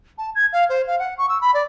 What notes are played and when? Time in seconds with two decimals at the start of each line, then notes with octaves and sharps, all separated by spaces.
0.18 A5
0.35 G#6
0.53 F5
0.69 C5
0.87 F5
0.99 F#5
1.18 C#6
1.29 E6
1.41 B5
1.54 D5